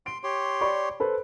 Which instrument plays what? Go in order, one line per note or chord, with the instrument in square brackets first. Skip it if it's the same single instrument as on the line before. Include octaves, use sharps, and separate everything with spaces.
[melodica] C6 [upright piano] D7
[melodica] G4 C#5 C6
[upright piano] D5 B5 C#6
A4 B4 C5